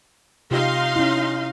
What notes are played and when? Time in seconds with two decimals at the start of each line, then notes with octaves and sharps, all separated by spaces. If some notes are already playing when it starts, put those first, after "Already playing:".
0.51 C3 D#4 F4 G4 F5 C6
0.96 C#4 E4